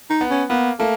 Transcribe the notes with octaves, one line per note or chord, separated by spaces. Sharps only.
D#4
B3
C#4
A#3 B3
A3 A#3